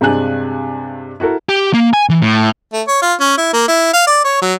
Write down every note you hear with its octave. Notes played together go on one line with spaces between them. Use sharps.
G2 C3 G#3 D4 G#5 F#6
E4 F#4 A4 A#4
G4
A#3
G#5
E3
A2
A3
C#5
F4
C#4
E4
A#3
E4
F5
D5
C#5
F#3